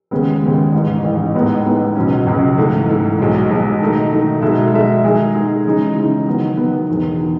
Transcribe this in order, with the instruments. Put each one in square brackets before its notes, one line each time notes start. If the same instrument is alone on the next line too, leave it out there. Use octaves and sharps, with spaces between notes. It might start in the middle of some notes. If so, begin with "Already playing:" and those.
[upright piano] D#2 C#3 G#3 B3
D#2 C#3 G#3 B3
A1 G#2 E3
A1 G#2 E3
A2 G#3 B3 D#4
A2 G#3 B3 D#4
C#2 B2 F#3 C#4
C#2 B2 F#3 C#4
G#2 E3 A3
G#2 E3 A3
B1 B2 G#3
B1 B2 G#3
D#3 A3 D#4
D#3 A3 D#4
B2 G#3 D#4 A4 E5
B2 G#3 D#4 A4 E5
D#3 G#3 D#4 G#4
D#3 G#3 D#4 G#4
C#3 E3 G#3 D#4
C#3 E3 G#3 D#4
D#3 F#3 B3
D#3 F#3 B3
E1 E2 D#3
D#3